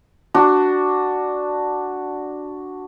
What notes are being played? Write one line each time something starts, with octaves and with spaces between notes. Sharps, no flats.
D4 F#4